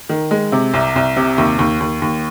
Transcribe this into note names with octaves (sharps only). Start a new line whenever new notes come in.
D#3
G#3
C3
C2
C2
C3
D#2
D#2
D#2
D#2